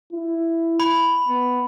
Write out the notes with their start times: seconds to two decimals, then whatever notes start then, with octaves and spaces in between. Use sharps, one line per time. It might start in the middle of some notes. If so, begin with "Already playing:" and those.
0.13 E4
0.80 B5
1.28 B3